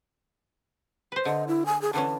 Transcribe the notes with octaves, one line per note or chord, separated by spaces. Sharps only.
B4 C5
D3 D#5
E4
G#5
G#4
D3 E3 C#4 A5